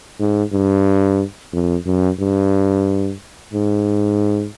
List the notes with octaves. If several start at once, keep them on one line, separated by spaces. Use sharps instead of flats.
G#2
G2
F2
F#2
G2
G#2